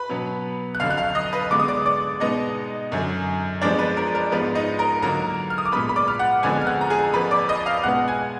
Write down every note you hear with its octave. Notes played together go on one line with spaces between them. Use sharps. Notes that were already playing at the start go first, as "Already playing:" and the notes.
Already playing: B4 B5
B2 F#3 B3
F#6
F2 D3 F#3 F5 F6
F#6
F5 F6
D#5 D#6
B4 B5
D3 G#3 B3 D6
D#6
D5 D6
D5 D6
B2 G#3 B3 D#4 D#5
F#2 D3 F#3
F2 F3 G#3 B3 D4 D5
B4
A#4
A#4
G#2 F3 G#3 B3 B4
D#4 D#5
A#4 A#5
D3 F#3 A#3 A#4 A#5
F6
D#6
D6
A#2 G#3 B3 B4 B5
B5
D5 D6
F6
F#5 F#6
F2 D3 F3 G#3 B3 G#5 G#6
F6
F#5 F#6
A#5
G#4 G#5
F2 F3 A#3 B4 B5
D5 D6
D#5 D#6
F5 F6
B2 G#3 B3 F#5 F#6
G#5 G#6